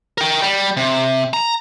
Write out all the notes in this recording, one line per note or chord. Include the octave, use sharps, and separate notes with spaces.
A#4 G5
G3
C3
A#5